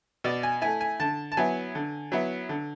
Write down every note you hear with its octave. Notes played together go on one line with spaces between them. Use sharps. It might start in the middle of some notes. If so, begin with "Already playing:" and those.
B2 D5
G#5
A3 E4 G#5
G#5
D3 A5
A5
F#3 B3 E4 G#5
D3
F#3 B3 E4
D3